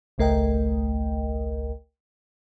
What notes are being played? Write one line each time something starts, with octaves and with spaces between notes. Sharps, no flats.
G#1 C#2 A3 A#4 D#5 G5